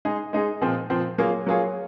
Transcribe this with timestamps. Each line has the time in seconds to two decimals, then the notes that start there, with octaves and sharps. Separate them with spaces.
0.05 G#3 D#4 G#4
0.33 G#3 D#4 G#4
0.61 A#2 F3 C4
0.90 A#2 F3 C4
1.18 F#3 A#3 F4 G#4 C#5
1.47 F#3 A#3 F4 G#4 C#5